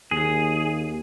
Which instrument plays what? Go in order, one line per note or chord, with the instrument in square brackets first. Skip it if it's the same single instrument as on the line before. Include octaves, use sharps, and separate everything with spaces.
[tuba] D#2 [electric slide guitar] G#4